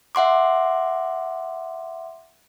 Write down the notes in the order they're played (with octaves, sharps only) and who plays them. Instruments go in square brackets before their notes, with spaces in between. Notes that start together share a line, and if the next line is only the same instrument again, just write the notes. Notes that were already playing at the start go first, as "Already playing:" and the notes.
[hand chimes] E5 F#5 C6 D6